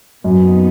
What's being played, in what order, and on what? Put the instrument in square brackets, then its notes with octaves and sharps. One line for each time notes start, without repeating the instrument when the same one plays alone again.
[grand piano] F#2 [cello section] A#2 G3 B3 D#4